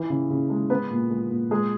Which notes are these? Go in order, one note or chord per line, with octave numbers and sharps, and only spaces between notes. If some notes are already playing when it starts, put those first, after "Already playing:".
Already playing: E3
C#3
C#3
G#3
G#3 B3 B4
A#2
G#3
A#2
G#3 G#4